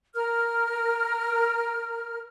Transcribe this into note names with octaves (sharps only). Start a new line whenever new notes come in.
A#4 F6